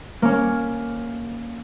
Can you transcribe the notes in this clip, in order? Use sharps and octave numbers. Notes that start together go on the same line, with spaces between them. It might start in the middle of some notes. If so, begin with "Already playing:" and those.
A#3 C#4